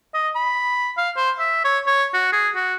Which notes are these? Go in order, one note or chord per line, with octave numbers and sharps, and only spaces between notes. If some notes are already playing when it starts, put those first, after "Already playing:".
D#5
B5
F5
C5
E5
C#5
C#5
F#4
G#4
F#4